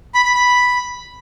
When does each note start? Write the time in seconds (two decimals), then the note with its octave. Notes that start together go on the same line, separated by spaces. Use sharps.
0.14 B5
0.25 B5
0.35 B5